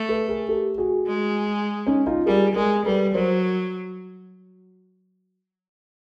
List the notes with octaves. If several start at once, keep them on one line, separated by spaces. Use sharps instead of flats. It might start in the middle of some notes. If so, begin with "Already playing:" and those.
Already playing: A3
A4 B4
G#4 A#4
G4 A4
F#4 G#4
G#3
C#4 D#4
D#4 F4
G3 G#4 A#4
G#3 G#4 A#4
G3 A4 B4
F#3 A#4 C5